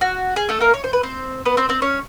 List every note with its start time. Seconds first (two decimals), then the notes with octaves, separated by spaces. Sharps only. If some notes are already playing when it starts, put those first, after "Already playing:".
0.01 F#4
0.36 G#4
0.49 A3 A4
0.60 A#3 A#4
0.74 C#5
0.84 C5
0.93 B4
1.03 C4 C5
1.45 B3 B4
1.57 C4 C5
1.69 C4 C5
1.82 C#4 C#5